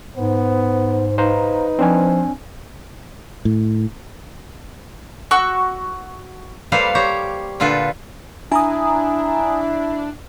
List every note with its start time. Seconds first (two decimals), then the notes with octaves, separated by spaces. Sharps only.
0.17 G#2 B3 C5
1.18 D#4 B4 C5 F5 A#5
1.79 F3 C4 D4 G#5
3.45 A2
5.31 F#4 C#6 E6
6.72 G3 A#3 A4 B4 C5 F5
6.95 G4 C5 C#5 A#5
7.60 A#2 D3 F4 A4 B4
8.52 D4 E4 G#5 A#5 D#6